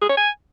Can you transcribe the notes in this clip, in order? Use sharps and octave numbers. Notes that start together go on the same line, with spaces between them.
G#4
C#5
G#5